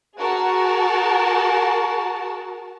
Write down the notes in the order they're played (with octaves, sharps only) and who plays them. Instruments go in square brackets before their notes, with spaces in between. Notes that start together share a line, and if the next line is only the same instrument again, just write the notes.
[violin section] F#4 G#4 A#4 A5